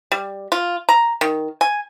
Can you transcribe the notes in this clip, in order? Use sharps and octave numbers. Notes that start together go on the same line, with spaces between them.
G3
F4
A#5
D#3
G#5